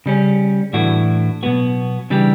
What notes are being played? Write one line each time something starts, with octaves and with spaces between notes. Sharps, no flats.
C#3 G3 C#4
A2 E3 A3 D4 F#4
B2 F#3 B3 F#4
C#3 E3 G3 D4 G4